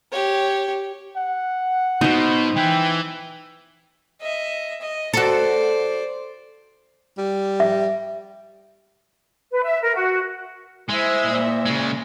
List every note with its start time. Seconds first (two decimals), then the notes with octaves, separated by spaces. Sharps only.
0.11 G4 C#5
1.17 F#5
2.01 B2 D#4 C5
2.56 E3 G5
4.20 D#5 E5
4.80 D#5
5.13 F#4 A4 C5 D5
7.18 G3
7.60 E5
9.51 B4
9.63 E5
9.81 A#4
9.95 F#4
10.90 G#3 E4 C5 E5
11.26 A#2
11.66 C#3 G#3